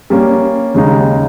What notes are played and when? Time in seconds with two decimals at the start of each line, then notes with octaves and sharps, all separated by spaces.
0.10 G3 A#3 C#4
0.74 D#2 C#3 G#3 D#4